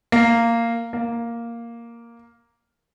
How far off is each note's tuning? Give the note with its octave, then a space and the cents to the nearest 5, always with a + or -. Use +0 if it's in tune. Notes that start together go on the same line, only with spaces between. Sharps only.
A#3 -10
A#3 +0